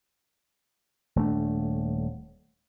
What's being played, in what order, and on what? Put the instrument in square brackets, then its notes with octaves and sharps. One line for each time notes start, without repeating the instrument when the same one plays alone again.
[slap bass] D#1 A3 D4